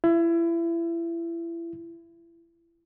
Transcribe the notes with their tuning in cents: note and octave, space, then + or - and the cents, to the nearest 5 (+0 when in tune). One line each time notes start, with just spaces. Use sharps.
E4 +30